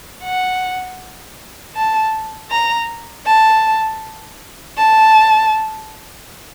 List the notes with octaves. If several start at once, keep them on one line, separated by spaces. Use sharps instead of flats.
F#5
A5
A#5
A5
A5